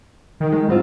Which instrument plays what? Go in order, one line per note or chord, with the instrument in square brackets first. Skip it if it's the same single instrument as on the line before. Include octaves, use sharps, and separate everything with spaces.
[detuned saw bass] D#3
[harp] G#3
[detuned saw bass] G#2 [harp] G3 C4 F4